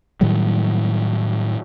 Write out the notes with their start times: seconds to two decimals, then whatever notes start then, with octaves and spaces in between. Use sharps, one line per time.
0.21 A2 D#3 F#3 G3